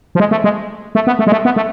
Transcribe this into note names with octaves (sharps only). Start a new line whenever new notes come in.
F3
G#3
A3
G#3
A3
B3
A3
G#3
A3
B3
A3